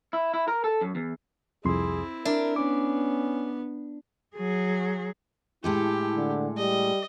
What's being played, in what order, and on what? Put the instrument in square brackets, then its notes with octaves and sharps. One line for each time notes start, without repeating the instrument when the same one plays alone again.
[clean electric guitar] E4
E4
A#4
A4
F#2
E2
[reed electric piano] C2 F2 C6 [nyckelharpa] C4 E4 [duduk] G#4
[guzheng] D4 [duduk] A#4 [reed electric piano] E5
[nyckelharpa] B3 [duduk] C#4 [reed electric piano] D6
[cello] F#3 G#4
[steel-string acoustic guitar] A2 G#3 A4 [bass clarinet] E4 [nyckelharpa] G4
[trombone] D3
[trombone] G3 [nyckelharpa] D#5